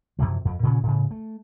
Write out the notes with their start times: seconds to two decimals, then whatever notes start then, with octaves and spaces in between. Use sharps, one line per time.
0.19 F#2 C3 E3 F3
0.45 F2
0.63 A#2 C#3 C#4
0.83 A2 C#3
1.11 A3